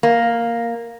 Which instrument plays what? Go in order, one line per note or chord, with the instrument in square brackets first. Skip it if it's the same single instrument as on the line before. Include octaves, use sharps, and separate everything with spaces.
[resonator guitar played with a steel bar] A#3